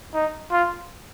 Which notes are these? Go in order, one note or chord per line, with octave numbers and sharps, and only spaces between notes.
D#4
F4